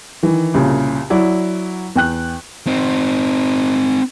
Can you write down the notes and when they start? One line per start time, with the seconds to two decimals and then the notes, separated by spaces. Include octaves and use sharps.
0.23 D#3 E3
0.54 C2 A#2 C#3
1.10 F#3 E4 D5
1.96 E2 G5 F#6
2.67 C4 D#4